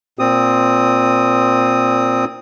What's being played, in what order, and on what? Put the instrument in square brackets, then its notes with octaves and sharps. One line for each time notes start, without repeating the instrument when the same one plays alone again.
[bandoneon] A#2 C4 D#6